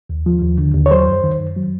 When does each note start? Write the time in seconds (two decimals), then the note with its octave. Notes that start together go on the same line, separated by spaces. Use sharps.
0.10 D#2
0.26 F3
0.42 D#2
0.58 D3
0.74 D#2
0.86 C#5
0.91 F#3 C5
1.07 F#2
1.24 D#3
1.40 F#2
1.56 F#3